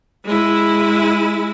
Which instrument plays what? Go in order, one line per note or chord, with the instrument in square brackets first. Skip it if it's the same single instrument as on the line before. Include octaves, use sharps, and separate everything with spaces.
[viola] G#3 E4